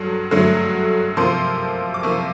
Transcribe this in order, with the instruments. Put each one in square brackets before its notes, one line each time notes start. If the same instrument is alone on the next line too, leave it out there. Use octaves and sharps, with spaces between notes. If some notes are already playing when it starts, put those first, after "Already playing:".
Already playing: [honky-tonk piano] G2 D3 F#3
G2 D3 F#3 A3
C3 F3 A#3 C6
D6
C3 F3 A#3 C#6